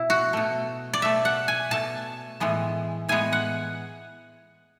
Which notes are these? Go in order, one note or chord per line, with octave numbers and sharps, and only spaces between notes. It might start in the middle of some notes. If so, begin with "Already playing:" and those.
Already playing: B2 E4
F#4
B2 A3
D5
B2 A3 E5
F#5
G#5
B2 A3 A5
A2 E3 G#3 B3
A2 E3 G#3 B3 G#5
F#5